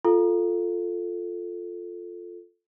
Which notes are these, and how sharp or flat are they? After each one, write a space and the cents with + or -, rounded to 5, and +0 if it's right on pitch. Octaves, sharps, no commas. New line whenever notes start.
F4 +0 A4 +0